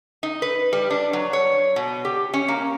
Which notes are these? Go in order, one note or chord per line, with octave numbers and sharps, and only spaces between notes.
D#4
B4
G3
D4
F#3
C#5
B2
G4
C#4
A#3